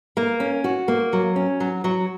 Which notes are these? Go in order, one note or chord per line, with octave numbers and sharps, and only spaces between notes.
A#3
C#4
F#4
A#3
F#3
C#4
F#3
F#3